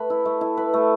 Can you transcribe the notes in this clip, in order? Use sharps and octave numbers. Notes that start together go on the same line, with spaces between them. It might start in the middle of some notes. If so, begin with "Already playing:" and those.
Already playing: A3 B4
E4
A3
E4
B4
A3